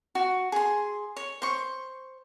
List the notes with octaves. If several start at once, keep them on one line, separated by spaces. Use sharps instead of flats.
F#4
G#4 C6
C#5
C5 C#6